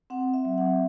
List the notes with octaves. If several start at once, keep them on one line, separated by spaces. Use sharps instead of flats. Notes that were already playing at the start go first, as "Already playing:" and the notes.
C4 F#5
E5
F#3
F#5